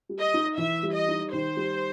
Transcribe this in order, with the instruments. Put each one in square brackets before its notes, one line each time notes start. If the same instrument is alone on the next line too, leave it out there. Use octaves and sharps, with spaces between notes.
[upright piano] G3
[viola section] D#5
[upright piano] D#4
[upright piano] E3 [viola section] E5
[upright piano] G3
[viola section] D#5
[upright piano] D#4
[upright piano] D#3 [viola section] C5
[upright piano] G3